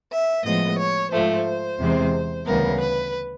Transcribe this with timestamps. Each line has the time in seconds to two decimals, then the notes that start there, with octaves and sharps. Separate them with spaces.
0.11 E5
0.45 A2 F3 G#3 B3 D#5
0.79 C#5
1.11 G#2 F3 A3 C5
1.79 E2 C3 E3 G#3 C4
2.46 D2 C#3 E3 G3 B3 A#4
2.80 B4